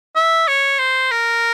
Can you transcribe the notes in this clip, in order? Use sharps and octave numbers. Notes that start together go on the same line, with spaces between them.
E5
C#5
C5
A#4